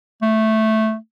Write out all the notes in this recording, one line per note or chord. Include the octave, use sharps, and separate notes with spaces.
A3